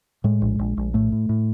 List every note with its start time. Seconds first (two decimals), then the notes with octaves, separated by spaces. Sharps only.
0.24 A2 G#3
0.42 A#1
0.59 A#1
0.77 A#1
0.94 A2 A3
1.12 A2
1.29 A2